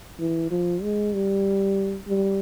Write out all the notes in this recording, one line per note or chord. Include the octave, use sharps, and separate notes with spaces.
E3
F3
G#3
G3
G3